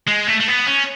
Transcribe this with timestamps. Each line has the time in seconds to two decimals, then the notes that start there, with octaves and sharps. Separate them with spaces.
0.08 G#3
0.28 A3
0.40 A3
0.48 B3
0.66 C#4